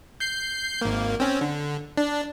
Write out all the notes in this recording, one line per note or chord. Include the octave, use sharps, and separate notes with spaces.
G6 C7
G#1 A#3
C4 C#4
D3
D4